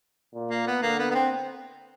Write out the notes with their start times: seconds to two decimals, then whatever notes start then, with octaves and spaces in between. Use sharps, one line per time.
0.34 A#2
0.50 A#3
0.67 B3
0.82 D3 A#3
0.99 B3
1.11 B3
1.15 C4